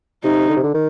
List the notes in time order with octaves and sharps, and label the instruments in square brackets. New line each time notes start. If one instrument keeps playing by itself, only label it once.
[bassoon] C3 [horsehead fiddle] D#4
[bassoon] D3
C3
D3
D#3